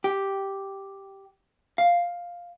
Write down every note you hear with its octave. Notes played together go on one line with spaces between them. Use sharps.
G4
F5